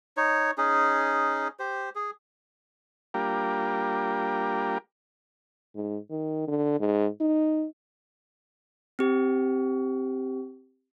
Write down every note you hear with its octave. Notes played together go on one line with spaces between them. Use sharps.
D#4 C#5
C#4 D#4 G#4
G4 C5
G#4
G3 A#3 D4 F4 G4 A#4
G#2
D#3
D3
G#2
D#4
C4 G4